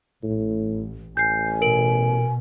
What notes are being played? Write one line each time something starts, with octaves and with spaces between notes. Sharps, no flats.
A1 A2
A1 G#5 G6 C7
B2 A#4 D7 F#7